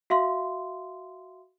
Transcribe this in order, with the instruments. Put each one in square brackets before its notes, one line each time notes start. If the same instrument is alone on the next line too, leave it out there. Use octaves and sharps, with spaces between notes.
[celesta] F#4 E5 F5 C6